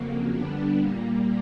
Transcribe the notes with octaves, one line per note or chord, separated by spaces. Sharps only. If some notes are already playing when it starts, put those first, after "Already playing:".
Already playing: F2 C#3 F#3 A#3
D3 G3 B3 D4
A#2 G3 A#3